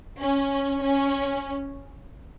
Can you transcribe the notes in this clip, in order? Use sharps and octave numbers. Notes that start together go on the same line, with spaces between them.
C#4
C#4